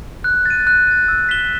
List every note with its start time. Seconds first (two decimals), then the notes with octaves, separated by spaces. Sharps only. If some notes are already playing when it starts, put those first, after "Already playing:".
0.24 F#6
0.46 A6 D#7
0.67 F#6
0.87 A6 D#7
1.08 E6
1.29 B6 E7 G7